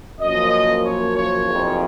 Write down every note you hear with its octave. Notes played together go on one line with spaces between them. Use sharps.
F#2 F3 A#3 C#4 D#5
C#5
C#5
F#1 F2 C#3